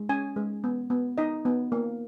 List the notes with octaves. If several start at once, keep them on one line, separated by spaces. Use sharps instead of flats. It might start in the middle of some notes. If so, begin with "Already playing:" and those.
Already playing: G#3
C#4 G#5
G#3
B3
B3
D#4 D#5
B3
A#3